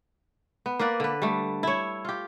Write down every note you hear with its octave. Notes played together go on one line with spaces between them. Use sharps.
B3
A#3 A#4 B4 D5
D3 B4
G3 A3
E4 C#5
F4 G4